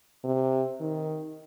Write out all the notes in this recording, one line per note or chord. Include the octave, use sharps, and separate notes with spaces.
C3
D#3